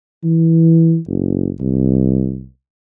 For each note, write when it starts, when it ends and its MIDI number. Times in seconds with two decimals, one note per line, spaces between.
0.24 0.97 52
1.07 1.50 30
1.60 2.46 36